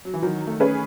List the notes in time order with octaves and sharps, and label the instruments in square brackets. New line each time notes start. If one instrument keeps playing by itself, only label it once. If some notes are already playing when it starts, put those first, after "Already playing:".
[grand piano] F#3
E3
[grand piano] D#3 [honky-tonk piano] F#3
[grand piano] A3
[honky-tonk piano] C#4 G#4 B4